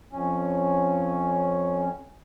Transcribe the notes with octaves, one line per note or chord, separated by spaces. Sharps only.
F2 C#4